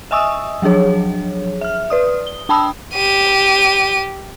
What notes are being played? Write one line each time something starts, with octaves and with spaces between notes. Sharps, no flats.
D#5 E5 G#5 C#6 D#6 E6
F3 F#3 D4 G#4 C#5
E5 F6
B4 D5 D#6
G7
D4 G5 A5 B5 D#6 E6
G4 D#7